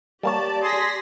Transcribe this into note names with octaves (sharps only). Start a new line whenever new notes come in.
G3 A#3 G4 C#5 D5 A5
G#4 C6 A#6 B6